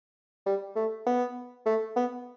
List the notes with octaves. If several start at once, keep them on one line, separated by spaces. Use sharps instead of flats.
G3
A3
B3
A3
B3